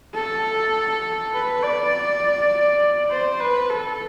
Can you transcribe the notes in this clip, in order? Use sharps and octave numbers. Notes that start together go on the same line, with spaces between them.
A4
B4
D5
C5
B4
A4